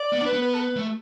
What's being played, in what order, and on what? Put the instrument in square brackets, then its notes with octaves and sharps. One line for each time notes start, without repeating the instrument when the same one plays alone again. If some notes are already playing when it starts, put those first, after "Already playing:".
Already playing: [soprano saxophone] D5
[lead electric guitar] B3
[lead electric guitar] D4 [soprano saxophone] B4
[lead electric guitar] B3
[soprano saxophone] B4
A4
B4
[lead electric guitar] A3